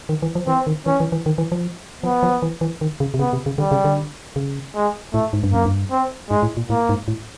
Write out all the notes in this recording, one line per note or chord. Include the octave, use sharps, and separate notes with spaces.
D#3
E3
F3
E3 C4
D#3
E3 C#4
E3
E3
D#3
E3
F3
F3 B3
F3
E3
E3
D#3
C#3
C3
C#3 B3
C3
C#3
D3 G3
C#3
D3
C#3
G#3
A2 A3
G#2
G2
F#2 A#3
G2
C4
G#2 G#3
A2
A#2
A2 A#3
G#2
A2